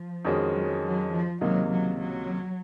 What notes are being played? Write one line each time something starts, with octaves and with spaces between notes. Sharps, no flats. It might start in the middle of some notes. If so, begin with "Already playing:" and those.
Already playing: F3
F2 D#3 G#3 C#4 F#4
F#3
F#3
F3
C#2 C3 D#3 F#3 A#3 D#4
F#3
F#3